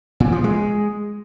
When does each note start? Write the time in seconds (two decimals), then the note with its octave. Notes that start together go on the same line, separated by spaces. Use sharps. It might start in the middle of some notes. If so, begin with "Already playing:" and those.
0.20 A#2
0.32 F3
0.44 G#3